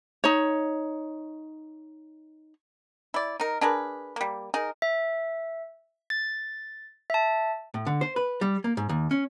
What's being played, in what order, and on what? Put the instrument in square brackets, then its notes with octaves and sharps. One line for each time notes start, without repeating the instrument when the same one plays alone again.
[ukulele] D#4 C#5
[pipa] E4 D5
D#4 A#4
D4 G#4 A#4 B4
G3 A#3
D#4 G#4 A#4
[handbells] E5
A6
E5 A5
[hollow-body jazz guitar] A2
D3
C5
B4
G3
A#3
G#2
D#2
C#4